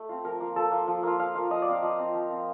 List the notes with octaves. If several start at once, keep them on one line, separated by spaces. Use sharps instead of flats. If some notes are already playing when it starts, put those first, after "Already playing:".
Already playing: A3
C4 F4
F3 A#4
A#3 F4
F3 A4
A#3 F4
F3
A#3 F4
F3 F5
A#3 F4
F3 D#5
D5
C4 F4 F5
F3 D#5
C4 F4
F3
C4 F4